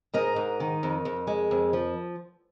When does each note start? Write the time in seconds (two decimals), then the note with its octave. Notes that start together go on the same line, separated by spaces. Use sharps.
0.14 G#2 A#4 D#5
0.36 G#2
0.60 D#3
0.83 F2
1.05 F2
1.27 G#3
1.51 F2
1.73 F3